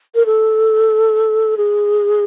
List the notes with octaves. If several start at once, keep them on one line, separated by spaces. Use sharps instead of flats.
A#4
A4
G#4